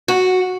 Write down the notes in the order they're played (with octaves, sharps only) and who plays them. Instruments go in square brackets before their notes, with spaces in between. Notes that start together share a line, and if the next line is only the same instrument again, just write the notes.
[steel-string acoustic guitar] F#4